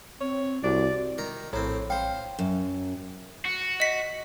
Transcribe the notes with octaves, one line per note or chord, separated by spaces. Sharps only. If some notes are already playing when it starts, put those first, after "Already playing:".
C4 C#5
C2 F#4 D5
D#3 A#5
A#1 A2 C4 C#5 A#5
C5 F5 G5
F#2
F#4
D#5 B6